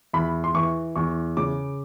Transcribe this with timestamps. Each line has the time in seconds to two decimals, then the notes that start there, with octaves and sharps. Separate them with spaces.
0.13 E2 B5
0.44 C6
0.55 E3 C#6
0.96 E2 C#6
1.37 C#3 D6